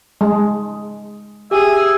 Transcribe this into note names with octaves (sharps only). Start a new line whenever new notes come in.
G#3
G4 G#4 E5 G#5